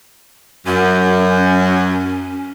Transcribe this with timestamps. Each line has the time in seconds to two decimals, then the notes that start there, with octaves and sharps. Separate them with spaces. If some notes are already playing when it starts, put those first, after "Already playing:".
0.67 F#2 C#4